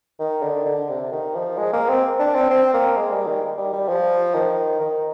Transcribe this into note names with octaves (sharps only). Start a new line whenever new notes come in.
D#3
D3
D3
C3
D#3
F3
G#3
A#3
C4
D4
C4
C4
A#3
G#3
G3
D#3
G3
G3
F3
D#3
D#3